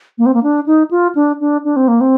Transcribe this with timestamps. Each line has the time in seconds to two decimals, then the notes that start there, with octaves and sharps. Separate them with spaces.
0.18 A#3
0.26 C4
0.34 A#3
0.43 D4
0.66 D#4
0.91 F4
1.15 D4
1.40 D4
1.65 D4
1.76 C4
1.88 A#3
2.01 C4